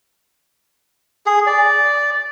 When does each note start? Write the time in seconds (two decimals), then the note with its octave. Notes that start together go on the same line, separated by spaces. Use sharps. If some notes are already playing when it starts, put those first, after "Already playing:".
1.26 G#4
1.47 D5